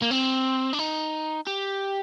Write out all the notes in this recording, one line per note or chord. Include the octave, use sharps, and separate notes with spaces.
A#3
C4
D4
D#4
G4